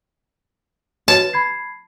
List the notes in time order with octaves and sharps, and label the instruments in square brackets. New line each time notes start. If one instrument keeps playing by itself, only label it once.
[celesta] F#4 B4 C#5 [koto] A5
[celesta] B5 G#6 C7